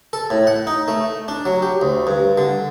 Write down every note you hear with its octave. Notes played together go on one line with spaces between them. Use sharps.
A4
A2
F#5
D#4
A3
D4
F#3
G4
D2
G2
D3